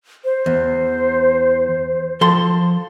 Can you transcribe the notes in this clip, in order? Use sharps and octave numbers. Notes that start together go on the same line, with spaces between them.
C5
E2
F3 A4 C6